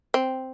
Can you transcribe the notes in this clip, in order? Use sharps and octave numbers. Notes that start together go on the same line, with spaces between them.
C4